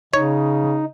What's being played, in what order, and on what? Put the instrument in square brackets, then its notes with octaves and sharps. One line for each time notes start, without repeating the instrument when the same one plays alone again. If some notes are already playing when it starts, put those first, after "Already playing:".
[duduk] C#3 [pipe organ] D#4 [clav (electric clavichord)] C#5